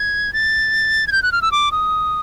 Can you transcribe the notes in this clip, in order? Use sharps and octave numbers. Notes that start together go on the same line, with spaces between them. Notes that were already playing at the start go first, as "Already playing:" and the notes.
Already playing: G#6
A6
G#6
G6
F#6
F6
E6
D6
D#6